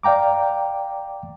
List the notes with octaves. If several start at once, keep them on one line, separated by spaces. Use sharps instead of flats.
D5 F5 G5 A#5 D6